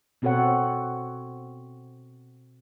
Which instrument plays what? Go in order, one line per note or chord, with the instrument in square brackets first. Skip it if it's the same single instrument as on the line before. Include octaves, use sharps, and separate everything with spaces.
[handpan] B2 C4 F#4 A4 C#5 F#5